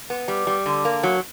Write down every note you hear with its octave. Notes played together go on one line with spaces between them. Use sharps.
B3
G3
G3
D3
A#3
F#3